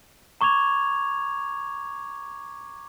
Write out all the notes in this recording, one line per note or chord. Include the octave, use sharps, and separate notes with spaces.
A#5 C#6 D6 G#6 F7